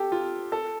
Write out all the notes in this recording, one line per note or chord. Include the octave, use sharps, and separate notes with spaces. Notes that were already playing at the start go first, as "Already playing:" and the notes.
Already playing: G4 A4
F4
A4